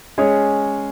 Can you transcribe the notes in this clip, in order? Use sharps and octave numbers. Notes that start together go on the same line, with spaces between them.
G#3 C#4 G#4 C#5